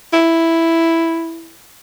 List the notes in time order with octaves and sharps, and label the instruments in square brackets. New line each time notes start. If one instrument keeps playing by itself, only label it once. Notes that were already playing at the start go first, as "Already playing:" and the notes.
[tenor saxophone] E4